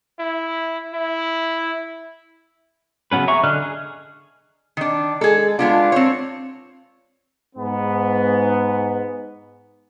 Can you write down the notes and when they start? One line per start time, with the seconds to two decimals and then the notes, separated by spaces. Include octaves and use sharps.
0.19 E4
0.94 E4
3.12 C#3 F#3 B3 C#4 B4
3.28 G#4 E5 A#5 C#6
3.44 D3 D#5 F6 F#6
3.62 G#4
4.77 D#3 D4
5.21 G#3 G#4 A4
5.59 G#3 B3 D4 F4
5.92 C4 C#5
7.56 G#2 B3